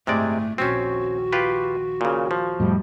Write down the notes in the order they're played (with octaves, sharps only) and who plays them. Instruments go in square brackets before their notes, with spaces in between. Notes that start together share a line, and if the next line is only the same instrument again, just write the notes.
[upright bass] G1 A2 [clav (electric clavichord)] C3 G#3 D5 [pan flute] A3
[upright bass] A#1 D#2 [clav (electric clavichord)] C4 C#4 [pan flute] F#4
[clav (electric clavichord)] F4 G4 B4
A#2 C#3
F3
[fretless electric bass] F2 A2 G3